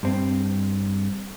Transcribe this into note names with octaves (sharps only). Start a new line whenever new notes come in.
G2 C4